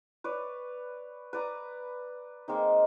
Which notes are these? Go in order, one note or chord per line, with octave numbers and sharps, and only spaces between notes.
B4 C#5 D5
B4 D5 A#5
G#3 A#3 C4 D#4